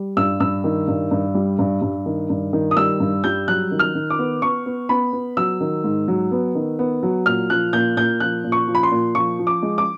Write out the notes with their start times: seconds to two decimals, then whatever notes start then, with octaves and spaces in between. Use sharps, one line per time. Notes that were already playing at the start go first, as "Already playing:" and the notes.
Already playing: G3
0.17 G2 E6
0.40 G2 E6
0.64 D#3
0.88 G2
1.11 G2
1.35 G3
1.59 G2
1.82 G2
2.06 D#3
2.30 G2
2.53 D#3
2.71 D#6
2.77 G3 E6
3.00 G2
3.24 G3 G6
3.48 F#3 F#6
3.71 D#3
3.79 F6
3.95 D#3
4.10 D6
4.19 B3
4.42 B3 C#6
4.66 B3
4.89 B3 B5
5.13 B3
5.37 F#3 E6
5.61 D#3
5.84 G#2
6.08 F#3
6.32 B3
6.55 D#3
6.79 B3
7.03 F#3
7.26 A#2 F6
7.50 F3 F#6
7.73 A#2 G6
7.97 A#2 G6
8.20 F3 F#6
8.44 A#2
8.52 C#6
8.68 F3
8.75 B5
8.83 C6
8.92 A#2
9.15 F3 C#6
9.39 F3
9.47 D6
9.63 G#3
9.78 D6